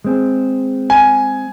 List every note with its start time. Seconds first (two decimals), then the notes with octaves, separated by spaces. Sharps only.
0.05 G#3 C4 G#4
0.90 G#5